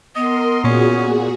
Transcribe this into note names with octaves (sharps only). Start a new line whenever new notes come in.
B3 A#4 D#5 C6
A#2 C#4 F#4 G#4